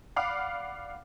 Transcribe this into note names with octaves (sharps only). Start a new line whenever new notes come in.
D5 F5 F#5 B5 D6 F6